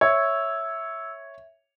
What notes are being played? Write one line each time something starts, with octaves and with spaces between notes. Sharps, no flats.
C#5 E5 E6 G#6